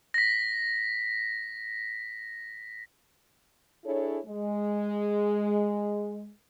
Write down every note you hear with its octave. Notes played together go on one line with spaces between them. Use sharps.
A#6 B6
D4 E4 G#4 A4 C#5
G#3